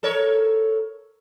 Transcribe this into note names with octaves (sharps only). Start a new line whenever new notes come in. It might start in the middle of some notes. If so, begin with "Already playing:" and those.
A4 A#4 C#5